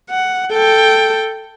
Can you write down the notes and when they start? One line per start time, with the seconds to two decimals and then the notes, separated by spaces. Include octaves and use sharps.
0.10 F#5
0.52 A4 G5